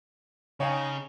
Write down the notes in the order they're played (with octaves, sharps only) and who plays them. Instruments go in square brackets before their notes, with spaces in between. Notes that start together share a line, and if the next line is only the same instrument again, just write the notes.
[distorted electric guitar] C#3 [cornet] D#4 [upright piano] C#5 [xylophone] F5 G5 G#5